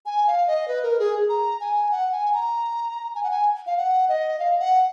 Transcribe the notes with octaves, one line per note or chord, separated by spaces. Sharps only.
G#5
F5
D#5
B4
A#4
G#4
A#5
G#5
F#5
G#5
A#5
G#5
F#5
G#5
F5
F#5
D#5
F5
F#5